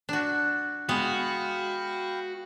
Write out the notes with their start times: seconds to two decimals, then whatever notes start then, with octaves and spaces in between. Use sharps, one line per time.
0.09 D4 F#4
0.89 G#3 B3 F#4 F5 G5 B5